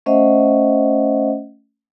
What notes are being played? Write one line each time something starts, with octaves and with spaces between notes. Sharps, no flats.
A3 C#4 C5 D#5 E5 F#5